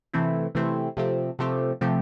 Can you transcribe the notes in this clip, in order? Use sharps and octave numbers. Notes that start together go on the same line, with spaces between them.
C3 E3 A3 C4 E4
C3 E3 A3 C4 E4
C3 F3 A3 C4 G4
C3 F3 A3 C4 G4
C3 F3 A3 C4 G4